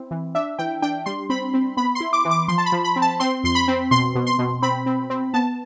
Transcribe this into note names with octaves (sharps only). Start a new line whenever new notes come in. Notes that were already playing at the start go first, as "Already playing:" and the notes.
Already playing: C4 E4
E3
D4 E5
E3 G5
D4 G5
G3 C6
C4 B5
C4
B3 B5
C6
E4
D6
E3
D6
F3 C6
A5
B5
F3
B5
C4
A5
C4 C6
F2 C6
B5
C4
B2 C6
B2
C6
B2
C4 B5
C4
C4
B3 A5